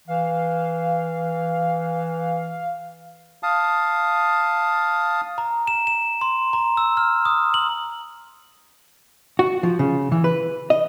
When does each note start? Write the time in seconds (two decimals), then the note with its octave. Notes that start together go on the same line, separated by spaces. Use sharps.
0.08 E3 F5
3.43 F5 A5 D#6
5.38 A#5
5.67 E7
5.87 E7
6.21 C6
6.53 A#5
6.77 E6
6.97 F6
7.25 D#6
7.54 F#7
9.39 F#4
9.63 F3
9.79 C#3
10.12 E3
10.24 B4
10.70 D#5